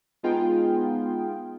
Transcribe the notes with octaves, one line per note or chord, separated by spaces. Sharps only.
G#3 B3 D#4 F4 G#4 G5